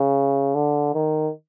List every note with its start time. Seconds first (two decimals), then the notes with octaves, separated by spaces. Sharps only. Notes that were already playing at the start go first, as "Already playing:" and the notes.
Already playing: C#3
0.54 D3
0.94 D#3